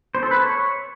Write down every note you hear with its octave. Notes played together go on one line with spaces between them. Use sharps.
C5
A4
B4
C#5